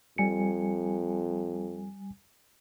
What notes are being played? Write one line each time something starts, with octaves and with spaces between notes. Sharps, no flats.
F2 G3 G#5 C#7